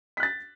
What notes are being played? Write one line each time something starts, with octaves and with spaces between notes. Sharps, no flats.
F#6 A6 B6